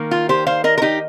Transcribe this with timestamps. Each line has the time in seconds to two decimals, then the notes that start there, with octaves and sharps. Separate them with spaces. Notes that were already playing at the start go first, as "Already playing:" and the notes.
Already playing: D#3 A#3
0.11 F4
0.29 G4 C5
0.47 C5 F5
0.64 A#4 D#5
0.78 A#4
0.82 D#4 G4